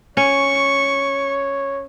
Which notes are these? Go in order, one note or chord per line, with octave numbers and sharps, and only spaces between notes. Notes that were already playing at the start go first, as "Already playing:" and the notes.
C#4 C#5 C#6